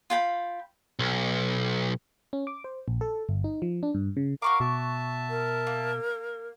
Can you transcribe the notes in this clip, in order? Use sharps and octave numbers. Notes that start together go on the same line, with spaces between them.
F4 G5 B5
B1
C#4
D6
C5
A#1
A4
G1
D#4
F3
D4
G2
C#3
F#4 A#4 F5 A#5 C#6 D6
B2 E5 A5
A#4
A#3